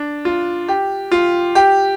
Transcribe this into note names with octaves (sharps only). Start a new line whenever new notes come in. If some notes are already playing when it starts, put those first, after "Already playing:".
Already playing: D4
F4
G4
F4
G4